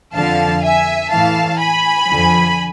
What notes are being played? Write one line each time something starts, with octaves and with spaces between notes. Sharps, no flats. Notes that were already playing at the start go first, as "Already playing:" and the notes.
F2 D3 F3 F5 A5
E5 G#5
A2 E3 F5 A5
G#5 B5
F2 D3 F3